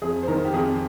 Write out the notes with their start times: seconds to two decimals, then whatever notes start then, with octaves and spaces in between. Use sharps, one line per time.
0.02 F2 G#4
0.23 C5
0.28 D#3 A#4
0.45 G4
0.54 F2 G#4